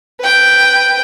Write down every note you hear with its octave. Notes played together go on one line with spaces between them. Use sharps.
B4 G5